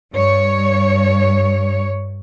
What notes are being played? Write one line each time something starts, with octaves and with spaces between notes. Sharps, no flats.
G2 C#5